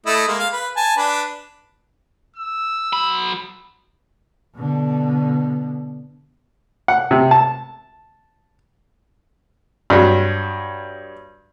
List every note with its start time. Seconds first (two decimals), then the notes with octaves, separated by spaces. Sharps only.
0.06 A3 E4 D#5
0.28 G#3 A#3
0.39 F5
0.53 B4
0.76 G#5 A5
0.97 D4 B4
2.36 E6
2.93 F#3 B5
4.56 B2 D3
6.88 F#5
7.11 C3
7.31 A5
9.90 G2 F#3